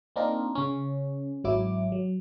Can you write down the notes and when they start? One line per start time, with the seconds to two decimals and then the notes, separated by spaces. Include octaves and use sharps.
0.16 A#3 C4 D4 D#4 F4 A#4
0.55 C#3 C#4
1.44 G#1 F#3 E4 D6
1.92 F#3